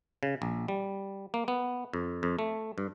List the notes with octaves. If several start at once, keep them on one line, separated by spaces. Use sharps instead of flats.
C#3
A#1
G3
A#3
B3
F2
F2
A3
G2